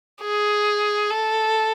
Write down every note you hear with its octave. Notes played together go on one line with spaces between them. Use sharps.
G#4
A4